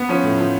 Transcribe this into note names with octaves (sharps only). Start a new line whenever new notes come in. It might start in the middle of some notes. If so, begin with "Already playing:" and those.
Already playing: B3
F3 C#4
A2
F3